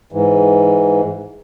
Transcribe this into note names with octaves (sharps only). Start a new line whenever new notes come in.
G#2 E3